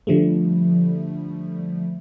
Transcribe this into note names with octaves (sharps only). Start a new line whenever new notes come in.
D3 F3 G3 A3